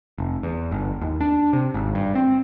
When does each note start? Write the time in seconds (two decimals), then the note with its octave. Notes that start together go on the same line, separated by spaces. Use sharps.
0.18 F1
0.43 E2
0.71 G1
1.01 D#2
1.21 D4
1.53 C3
1.74 G#1
1.95 G2
2.15 C4